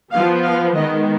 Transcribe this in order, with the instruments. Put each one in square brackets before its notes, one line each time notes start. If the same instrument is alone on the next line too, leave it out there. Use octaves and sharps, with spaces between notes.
[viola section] F3 B3 F5
F5
D#3 G#3 B3 D#5